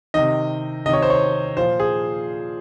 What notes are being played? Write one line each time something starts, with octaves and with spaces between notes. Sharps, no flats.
C3 D#3 D#5
C3 D#3 D#5
C#5
C5
C#5
A#2 F3 C5
G#4